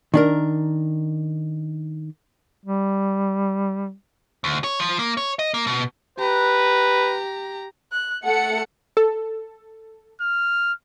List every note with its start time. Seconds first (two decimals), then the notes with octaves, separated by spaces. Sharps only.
0.14 D#3 D4 A#4
2.65 G3
4.44 D2
4.64 C#5
4.80 F3
4.99 A#3
5.17 C#5
5.39 D#5
5.54 A#3
5.67 B2
6.19 G4 B4 A#5
7.92 F#6
8.25 A3 A4 F#5 C#7
8.97 A4
10.21 F6